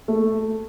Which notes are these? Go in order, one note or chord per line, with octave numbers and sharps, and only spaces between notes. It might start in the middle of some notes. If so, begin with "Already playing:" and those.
A3